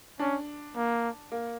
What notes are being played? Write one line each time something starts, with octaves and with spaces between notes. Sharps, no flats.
C#4 D4
A#3
A#3